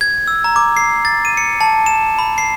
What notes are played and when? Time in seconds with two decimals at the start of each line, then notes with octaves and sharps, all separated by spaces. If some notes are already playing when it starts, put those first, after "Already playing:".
0.01 G#6
0.28 E6
0.44 A#5
0.56 D6
0.77 C7
1.05 A6
1.25 D#7
1.37 C#7
1.61 A5
1.86 E7
2.19 B5
2.38 C7